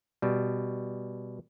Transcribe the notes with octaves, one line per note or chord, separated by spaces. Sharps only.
B2 G3